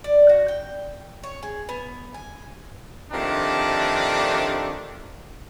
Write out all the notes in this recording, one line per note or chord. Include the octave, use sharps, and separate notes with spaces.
D5
F#4
G5
C#5
G#4
B3
G#5
C3 D#3 F3 A3 D4